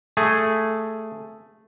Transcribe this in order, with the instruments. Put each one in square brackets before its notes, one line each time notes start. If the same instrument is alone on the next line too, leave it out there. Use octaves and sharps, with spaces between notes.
[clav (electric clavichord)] A3 G#4